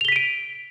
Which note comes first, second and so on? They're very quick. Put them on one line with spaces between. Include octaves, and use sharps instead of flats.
F7 G7 B6 D#7 D7